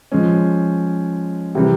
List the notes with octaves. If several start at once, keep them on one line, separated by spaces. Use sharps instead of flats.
F3 G#3 C#4
C3 E3 G3 C4